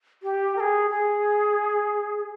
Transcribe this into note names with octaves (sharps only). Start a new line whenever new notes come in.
G4
A#4
G#4
G#4